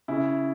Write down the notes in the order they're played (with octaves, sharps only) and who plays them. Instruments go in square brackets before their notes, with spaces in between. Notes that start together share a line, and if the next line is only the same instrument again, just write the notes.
[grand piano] C#3 E4